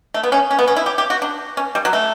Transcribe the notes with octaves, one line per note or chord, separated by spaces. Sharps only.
A3
B3
C#4
C#4
B3
C#4
E4
G4
G4
F#4
D4
C#4
G3
F#3
A3